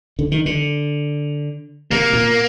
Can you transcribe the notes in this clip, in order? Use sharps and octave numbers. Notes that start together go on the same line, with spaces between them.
D3
D#3
D3
C3 A#3
A#2